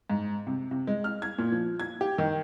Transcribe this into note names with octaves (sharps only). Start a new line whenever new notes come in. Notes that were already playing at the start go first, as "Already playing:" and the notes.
G#2
C3
C3
G#3
F6
G#6
A#2
F3
G#6
G4
D#3